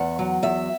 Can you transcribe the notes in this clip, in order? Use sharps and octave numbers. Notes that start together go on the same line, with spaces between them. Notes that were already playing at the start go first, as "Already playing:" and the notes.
Already playing: E2 F#5
F#3
E2 E5